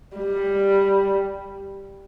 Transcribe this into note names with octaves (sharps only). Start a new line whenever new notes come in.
G3